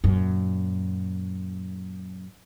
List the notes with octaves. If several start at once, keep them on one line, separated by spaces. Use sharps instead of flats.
F#2 A#2